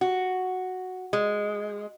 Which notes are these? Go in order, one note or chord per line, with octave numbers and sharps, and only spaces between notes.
F#4
G#3